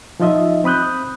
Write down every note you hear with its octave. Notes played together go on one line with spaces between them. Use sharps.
F3 D#4 F4 D#5 E5
C4 B5 D#6 F#6 G6